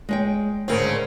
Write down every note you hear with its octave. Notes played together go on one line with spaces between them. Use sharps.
G#3 C#5 G5
D2 G#2 C#3 C4 A#4